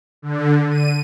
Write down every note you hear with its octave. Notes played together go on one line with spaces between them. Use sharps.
D3
D#7